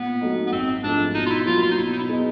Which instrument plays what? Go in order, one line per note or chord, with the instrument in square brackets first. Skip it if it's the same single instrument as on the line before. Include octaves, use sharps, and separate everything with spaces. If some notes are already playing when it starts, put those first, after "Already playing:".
Already playing: [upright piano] A#2 [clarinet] B3
[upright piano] F#3 A3 C4 D#4
[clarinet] B3
[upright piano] G#1 [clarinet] C4
[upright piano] G#2 F3 A3 [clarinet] D4
[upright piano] B2 [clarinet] D#4
[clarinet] F4
E4
[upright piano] F#3 A#3 [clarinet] F4
[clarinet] F4
D#4
[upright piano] B2 [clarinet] E4
[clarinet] D#4
E4
[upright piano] G#3 B3 D#4